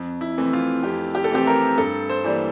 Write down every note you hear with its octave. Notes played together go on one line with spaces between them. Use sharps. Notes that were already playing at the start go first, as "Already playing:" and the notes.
Already playing: F2
E4
C3 E3 A3 C4
F4
F2 G4
G4
A4
C3 E3 A3 C4 G4
A#4
G2 A4
C5
E3 G3 A#3 D4